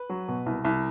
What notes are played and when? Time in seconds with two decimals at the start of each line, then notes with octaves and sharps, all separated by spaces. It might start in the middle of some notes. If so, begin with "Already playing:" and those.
Already playing: B4
0.09 F#3
0.28 B2
0.46 C2
0.65 C2